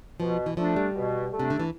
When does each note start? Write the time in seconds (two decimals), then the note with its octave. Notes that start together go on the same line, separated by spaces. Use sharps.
0.20 B2 F3
0.46 E3
0.57 F3 A3 D4
0.76 G3
0.95 B2
1.32 A3
1.37 C3 D4
1.50 D3
1.60 E3